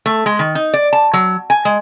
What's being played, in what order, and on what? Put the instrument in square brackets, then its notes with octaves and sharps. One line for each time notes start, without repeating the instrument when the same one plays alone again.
[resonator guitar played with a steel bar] A3
G#3
D#3
D#4
D5
A5
F#3
G#5
G#3